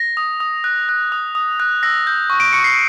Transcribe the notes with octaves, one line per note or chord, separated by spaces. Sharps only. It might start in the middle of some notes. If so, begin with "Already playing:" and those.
Already playing: A#6
D#6
D#6
F#6
F#6
D#6
D#6
F#6
E6 A#6
G6
C#6
D7
C#6 C#7
C7